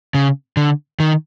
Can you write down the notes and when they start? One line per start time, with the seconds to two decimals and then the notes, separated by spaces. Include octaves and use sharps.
0.14 C#3
0.57 D3
1.00 D#3